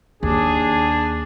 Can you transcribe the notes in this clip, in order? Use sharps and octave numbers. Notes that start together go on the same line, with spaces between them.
D#2 D4 G#4